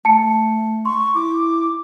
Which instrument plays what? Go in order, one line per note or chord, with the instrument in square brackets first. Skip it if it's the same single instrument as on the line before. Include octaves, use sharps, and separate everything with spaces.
[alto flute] A3 [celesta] A5 C#7
[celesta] C6 [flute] C#6
[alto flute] E4 [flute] D6